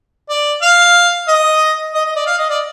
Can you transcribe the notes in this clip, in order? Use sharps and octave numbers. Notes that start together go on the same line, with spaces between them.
D5
F5
D#5
D#5
D#5
D5
F5
D#5
D5